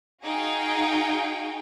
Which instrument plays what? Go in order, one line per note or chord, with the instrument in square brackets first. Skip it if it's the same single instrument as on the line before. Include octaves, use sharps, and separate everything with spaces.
[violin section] D#4 F#4 G#4 F5 G5